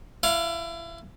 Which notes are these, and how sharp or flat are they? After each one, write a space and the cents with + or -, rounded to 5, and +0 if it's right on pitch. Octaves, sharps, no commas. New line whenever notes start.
E4 +30 F5 +15